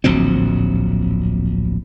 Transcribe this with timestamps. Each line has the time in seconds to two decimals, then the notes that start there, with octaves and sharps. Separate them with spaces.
0.04 D1 A#1 F#3 C4